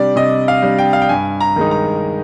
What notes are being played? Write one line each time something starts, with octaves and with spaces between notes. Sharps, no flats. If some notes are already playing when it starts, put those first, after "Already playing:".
Already playing: C3 G3 D4 D5
C3 D#5
F5
G3 D4
G5
F5
G5
G2 G#5
A#5
D#3 G#3 D#4
A#5